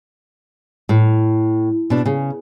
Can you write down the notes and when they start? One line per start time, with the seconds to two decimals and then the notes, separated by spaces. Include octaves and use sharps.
0.89 A2
1.90 B2 D4
2.06 C#3